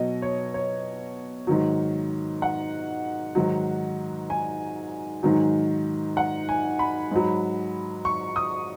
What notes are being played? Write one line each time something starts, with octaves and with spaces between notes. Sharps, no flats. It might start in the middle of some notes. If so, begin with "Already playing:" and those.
Already playing: B2 F#3 D#5
C#5
C#5
G#2 D#3 F#3
F#5
G#2 D#3 F#3
G#5
G#2 D#3 F#3
F#5
G#5
B5
G#2 F#3
C#6
D#6